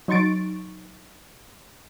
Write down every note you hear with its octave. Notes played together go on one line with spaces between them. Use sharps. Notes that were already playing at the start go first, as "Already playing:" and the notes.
F#3 D#4 C6 C#6 A6 D7